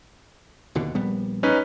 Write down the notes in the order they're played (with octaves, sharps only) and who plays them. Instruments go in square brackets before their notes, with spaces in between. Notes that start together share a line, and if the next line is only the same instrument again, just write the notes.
[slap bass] D#2 B2 D3
A#1 G3 B3
[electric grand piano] C#4 D#4 B4